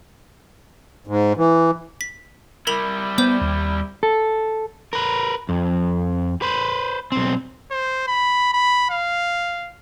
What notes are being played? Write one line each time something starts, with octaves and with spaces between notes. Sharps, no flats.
G#2
E3
B6
G3 E4 A#4 B5 F7
B3 C5 D5 G6
D#2
A4
A#4 B4
F2
B4 C5
B1 C4
C5
B5
B5
F5